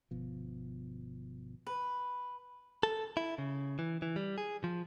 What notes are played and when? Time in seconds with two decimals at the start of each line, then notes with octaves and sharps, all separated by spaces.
0.11 G1 B2 F3
1.67 B4
2.83 A4
3.17 E4
3.38 C#3
3.79 E3
4.02 E3
4.16 G3
4.38 G#4
4.64 F3